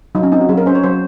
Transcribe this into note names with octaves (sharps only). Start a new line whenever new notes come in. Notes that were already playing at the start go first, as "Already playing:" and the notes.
F#3 D#4
C#4
C4 D#4
F#4
F#3 G#4
A#4
C#4 C5
C#5
F#3 C5